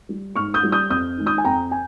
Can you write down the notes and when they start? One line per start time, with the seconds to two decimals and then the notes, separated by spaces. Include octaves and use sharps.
0.09 G3
0.36 G#2 C#6 F6
0.54 D#6 G6
0.63 G3
0.72 D#6 G6
0.90 F2 D#6 G6
1.17 D#3 G#3
1.26 D#6 G6
1.38 G#5
1.44 F2 G5 A#5
1.71 G#5